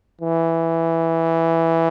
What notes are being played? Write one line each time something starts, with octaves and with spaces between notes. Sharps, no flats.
E3